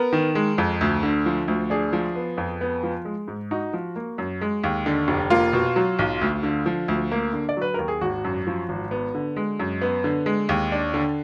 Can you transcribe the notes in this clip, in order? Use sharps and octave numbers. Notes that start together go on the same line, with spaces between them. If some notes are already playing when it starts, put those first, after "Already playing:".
Already playing: B3 A#4
D#3
G#3
F2
D2
D3
F3
D2
D4 G#4
F3
B3
F2
B3
F3
G#3
G#2
D#4 F#4
F3
A#3
F#2
G#3
D#2
D3
F1
A#3 F4
B2
F#3
B1
D2
D3
F3
D2
A#3
D3
D5
F#3 B4
D#2 A#4
G#4
G#1 F#4
F#2
F3
G#1
B3
D3
G#3
F#2
B3
D3
G#3
D#2
D4
D3